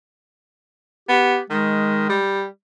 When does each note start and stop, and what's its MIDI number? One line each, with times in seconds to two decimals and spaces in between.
1.09 1.38 59
1.09 1.41 67
1.50 2.05 51
1.50 2.19 56
2.09 2.45 55